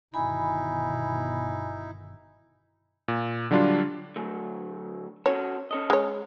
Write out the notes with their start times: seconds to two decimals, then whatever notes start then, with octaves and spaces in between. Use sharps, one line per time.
0.14 G1 B2 D#3 D#4 E4 G#5 B5
3.08 A#2
3.51 D3 F#3 G3 D4 F4
4.16 D2 F#3 A3
5.26 C#4 F#4 A4 C#5
5.71 C#4 A4 D#5
5.90 G#3 C#5